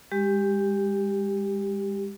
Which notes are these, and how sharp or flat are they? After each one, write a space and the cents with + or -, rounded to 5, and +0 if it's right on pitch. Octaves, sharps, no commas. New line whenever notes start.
G#3 -40 G4 +0